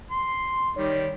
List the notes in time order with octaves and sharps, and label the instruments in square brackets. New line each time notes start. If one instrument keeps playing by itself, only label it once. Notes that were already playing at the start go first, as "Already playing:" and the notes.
[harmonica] C6
[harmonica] D#3 G3 [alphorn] C#5